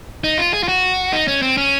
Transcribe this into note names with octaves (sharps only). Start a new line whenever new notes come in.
D#4
F4
G#4
F4
F#4
D#4
C#4
C4
C#4